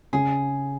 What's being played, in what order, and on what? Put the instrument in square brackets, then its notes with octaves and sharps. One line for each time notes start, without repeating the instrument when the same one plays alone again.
[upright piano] C#3 [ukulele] G#4